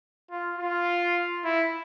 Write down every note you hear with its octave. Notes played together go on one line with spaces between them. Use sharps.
F4
F4
E4